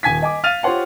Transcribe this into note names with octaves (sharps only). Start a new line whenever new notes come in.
D#1 G#5 G#6 B6
D#5 G#5 D6
F5 F6 A6 D#7 F7
F4 G4 C5 C#5 F#5 C6